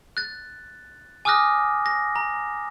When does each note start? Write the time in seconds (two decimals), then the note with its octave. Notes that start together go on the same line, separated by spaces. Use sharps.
0.17 F#6 A6
1.25 G#5 D6 D#6 F6 F#6 A#6
1.86 A#6
2.16 A#5